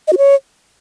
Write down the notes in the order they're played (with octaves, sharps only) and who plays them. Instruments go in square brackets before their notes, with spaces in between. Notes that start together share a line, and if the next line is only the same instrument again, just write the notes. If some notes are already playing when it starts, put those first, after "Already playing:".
[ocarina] D#5
F#4
C#5